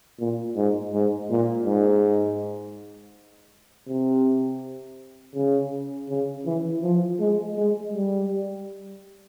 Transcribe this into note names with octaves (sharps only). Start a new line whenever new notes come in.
A#2
G#2
G#2
A#2
G#2
C3
C#3
C#3
E3
F3
G#3
G#3
G3